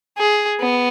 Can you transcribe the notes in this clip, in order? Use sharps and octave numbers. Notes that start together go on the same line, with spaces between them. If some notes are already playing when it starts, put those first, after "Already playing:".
G#4
B3